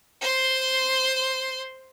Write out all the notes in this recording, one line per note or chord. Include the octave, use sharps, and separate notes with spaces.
C5 C6